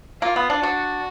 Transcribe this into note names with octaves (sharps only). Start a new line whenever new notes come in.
A#3 F4
B3
D4
D4 F#4